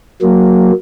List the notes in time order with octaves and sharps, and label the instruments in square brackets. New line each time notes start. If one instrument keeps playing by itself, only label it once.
[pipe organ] F#3 A#3